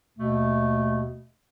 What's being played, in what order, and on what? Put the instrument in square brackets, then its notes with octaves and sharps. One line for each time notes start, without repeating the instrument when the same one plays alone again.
[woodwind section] D#2 B2 A3